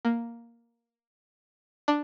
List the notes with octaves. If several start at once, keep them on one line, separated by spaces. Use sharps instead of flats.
A#3
D4